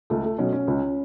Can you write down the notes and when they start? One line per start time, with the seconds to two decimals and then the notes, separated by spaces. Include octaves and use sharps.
0.10 C#2 A3
0.24 A3
0.38 B2 F#3 C#4
0.52 C#4
0.67 C#2